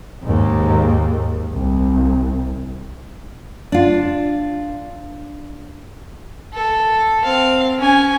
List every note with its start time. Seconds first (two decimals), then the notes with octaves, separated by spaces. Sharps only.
0.23 D#2 G#2
1.54 C2
3.72 D4 F4
6.54 A4
7.23 C4 F5
7.79 C#4 G#5